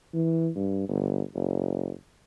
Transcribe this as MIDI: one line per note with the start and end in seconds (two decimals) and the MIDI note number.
0.14 0.50 52
0.56 0.85 43
0.89 1.21 31
1.35 1.92 30